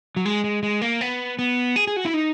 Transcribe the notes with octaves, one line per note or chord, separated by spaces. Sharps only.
F#3
G#3
G#3
G#3
A#3
B3
B3
G#4
G#4
F#4
E4
D#4